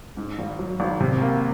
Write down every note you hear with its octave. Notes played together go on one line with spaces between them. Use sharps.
G#2
G#1
F#3
G#1
C3
A#3